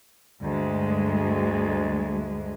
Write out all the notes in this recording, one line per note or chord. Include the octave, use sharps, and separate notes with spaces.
D2 G2 G#3